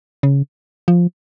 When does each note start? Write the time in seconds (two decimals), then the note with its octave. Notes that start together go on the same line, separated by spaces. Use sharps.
0.23 C#3
0.88 F3